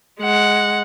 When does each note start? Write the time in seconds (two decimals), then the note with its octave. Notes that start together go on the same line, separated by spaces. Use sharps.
0.20 G#3 F#5